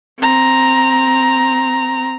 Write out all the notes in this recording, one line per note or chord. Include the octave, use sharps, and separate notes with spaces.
C4 A#5